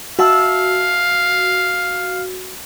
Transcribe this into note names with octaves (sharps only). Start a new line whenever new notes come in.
F#4 E5 F5 A5 E6